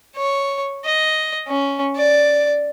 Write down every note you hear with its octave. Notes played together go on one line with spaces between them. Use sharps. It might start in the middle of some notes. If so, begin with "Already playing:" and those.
C#5
D#5
C#4
D5